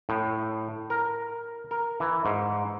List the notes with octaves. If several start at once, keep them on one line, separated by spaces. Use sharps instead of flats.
A2
A#4
A#4
E3
G#2